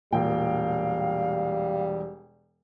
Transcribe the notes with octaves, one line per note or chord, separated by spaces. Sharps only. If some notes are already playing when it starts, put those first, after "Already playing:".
E1 A#2 G3 F5 G5